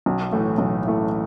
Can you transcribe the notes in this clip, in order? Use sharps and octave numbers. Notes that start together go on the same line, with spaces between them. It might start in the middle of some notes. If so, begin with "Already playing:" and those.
B1
A2 E3 A3
B1
A2 E3 A3